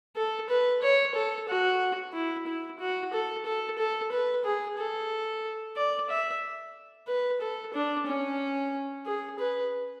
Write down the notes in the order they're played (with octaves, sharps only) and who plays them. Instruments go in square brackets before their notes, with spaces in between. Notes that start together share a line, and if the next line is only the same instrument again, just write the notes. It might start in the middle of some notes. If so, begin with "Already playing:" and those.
[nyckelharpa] A4
B4
C#5
A4
F#4
E4
E4
F#4
A4
A4
A4
B4
G#4
A4
D5
E5
B4
A4
D4
C#4
G#4
B4